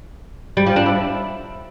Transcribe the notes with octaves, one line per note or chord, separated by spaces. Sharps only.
G3
F3
D4
E4